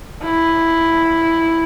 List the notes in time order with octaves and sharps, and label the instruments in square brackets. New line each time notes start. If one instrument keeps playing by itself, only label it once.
[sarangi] E4